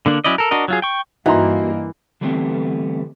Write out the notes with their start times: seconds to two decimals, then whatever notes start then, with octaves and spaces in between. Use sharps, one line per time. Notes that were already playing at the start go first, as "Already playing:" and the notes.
0.06 D3 A#3 D4
0.24 F#3 C#4 E4 D5 D#5
0.38 A4 A#4
0.51 D4 F#4 A#4 D#5
0.68 F#3 F4 G#4
0.82 G5 C#6
1.26 G2 E3 A#3 D#4 F#4 A#5 C6
2.21 D3 E3 G3 A3 B3 C4